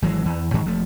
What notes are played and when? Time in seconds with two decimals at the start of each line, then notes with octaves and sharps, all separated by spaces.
0.02 G#1 E3 F#3 G#3
0.26 E2 E3
0.54 G#2 D#3 E3 G#3
0.65 E1 F3 A3